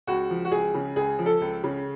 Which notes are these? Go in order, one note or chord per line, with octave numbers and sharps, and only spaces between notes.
C#2 F#4
F3
F#4
C#2 G#4
C#3
C#2 G#4
F3
A4
C#2
C#3